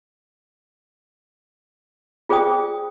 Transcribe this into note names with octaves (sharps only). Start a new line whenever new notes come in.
F4 G#4 C5 D5 G5 D#6